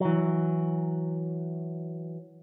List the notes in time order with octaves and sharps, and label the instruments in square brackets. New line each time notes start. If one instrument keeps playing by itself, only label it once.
[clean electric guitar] E3 F#3